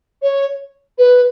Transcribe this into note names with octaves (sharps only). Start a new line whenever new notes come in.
C#5
B4